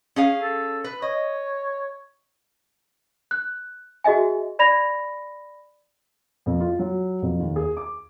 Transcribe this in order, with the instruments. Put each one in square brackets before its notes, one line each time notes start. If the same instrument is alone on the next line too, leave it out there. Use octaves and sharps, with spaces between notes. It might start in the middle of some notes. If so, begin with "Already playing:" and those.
[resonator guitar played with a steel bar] C#4 G#4 F5
[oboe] A4
[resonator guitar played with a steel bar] B4
[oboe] C#5 [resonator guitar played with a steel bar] D#5
[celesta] F#6
F#4 G#4 D#5 E5 G#5
D5 B5 A#6 F7
[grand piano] F2
F4
F#3
F2
D#2
G#4
D6